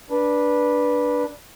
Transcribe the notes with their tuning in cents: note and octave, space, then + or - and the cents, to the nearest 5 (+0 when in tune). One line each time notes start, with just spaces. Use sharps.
D4 +0 B4 -15